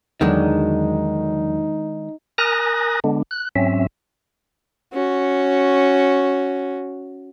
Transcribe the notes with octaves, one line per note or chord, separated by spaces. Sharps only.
E2 D3 D#3 F#3 G#3 D4 D#4
A#4 G#5 A#5 D#6 F#6 A#6
D3 G#3 B3 D4
F#6
G#2 F#3 C4 C#4 E5
C#4 F#4